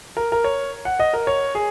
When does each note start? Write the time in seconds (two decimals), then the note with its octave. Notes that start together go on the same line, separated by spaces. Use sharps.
0.17 A#4
0.32 A#4
0.44 C#5
0.85 F#5
1.00 D#5
1.14 A#4
1.27 C#5
1.55 G#4